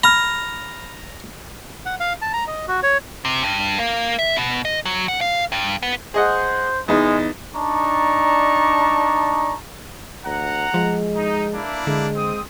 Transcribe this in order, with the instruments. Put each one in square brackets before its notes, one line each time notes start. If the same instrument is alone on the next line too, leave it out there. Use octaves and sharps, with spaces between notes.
[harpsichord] A#5 [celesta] B5 F6
[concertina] F#5
F5
A5
A#5
D#5
F#4
C#5
[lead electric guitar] C3
G2
A#3
E5
B2
D#5
F#3
F#5
F5
G2
B3
[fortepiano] G#4 D#5 F#5 [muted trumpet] C5
[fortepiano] E2 D#4 [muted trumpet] G#3
[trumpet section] D4 D#4 D5 A5 A#5 C#6
[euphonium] D2 [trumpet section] F#5 A#5
[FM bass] F3 [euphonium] G#3
[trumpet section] D#4
A#3 D4 E4
[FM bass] D3 [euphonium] G#3
[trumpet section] C4 D#6